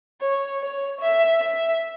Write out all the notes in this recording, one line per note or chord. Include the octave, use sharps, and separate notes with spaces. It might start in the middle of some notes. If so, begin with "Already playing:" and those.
C#5
C#5
E5
E5